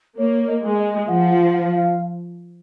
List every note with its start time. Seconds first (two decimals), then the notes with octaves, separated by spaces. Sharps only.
0.18 A#3 C#5
0.48 D#5
0.63 G#3
0.79 D#5
1.08 F3 F#5
1.31 F#5
1.54 F5
1.76 F5